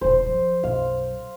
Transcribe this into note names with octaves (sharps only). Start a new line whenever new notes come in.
E1 D3 C5
F3
B1 F#2 F5